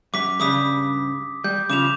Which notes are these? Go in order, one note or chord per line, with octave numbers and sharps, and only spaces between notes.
F#2 D6 B6
G2 C#3 G3 D6 D#6 B6
G3 G6
C#3 F3 D6 E7 F7